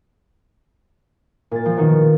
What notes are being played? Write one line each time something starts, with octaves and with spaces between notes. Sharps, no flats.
A#2 A6
F3
B2 D#3